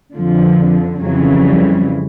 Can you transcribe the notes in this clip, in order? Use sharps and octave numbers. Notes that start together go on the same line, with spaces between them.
F2 D3 F3
F2 C#3 E3 F#3
G3